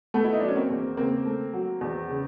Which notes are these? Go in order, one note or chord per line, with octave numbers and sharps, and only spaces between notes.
A3 B3
E4
D#4
F#3 D4
C#4
A#3 C4
E2
C#3 A#3 C4
A3
F#3
E2
C#3